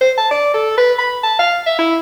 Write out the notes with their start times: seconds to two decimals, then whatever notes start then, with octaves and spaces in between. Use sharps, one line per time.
0.01 C5
0.17 A5
0.31 D5
0.54 A4
0.78 B4
0.98 B5
1.23 A5
1.39 F5
1.66 E5
1.79 E4